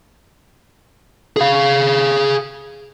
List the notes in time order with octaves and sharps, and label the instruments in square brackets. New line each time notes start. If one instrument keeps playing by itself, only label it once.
[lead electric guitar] G#4 F5